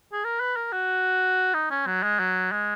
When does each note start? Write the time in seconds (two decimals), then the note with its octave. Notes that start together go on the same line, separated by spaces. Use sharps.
0.13 G#4
0.24 A#4
0.40 B4
0.56 A#4
0.72 F#4
1.54 D#4
1.70 C#4
1.86 F#3
2.03 G#3
2.19 F#3
2.52 G#3